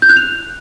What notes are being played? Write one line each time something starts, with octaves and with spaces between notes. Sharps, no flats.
G6
F#6
F7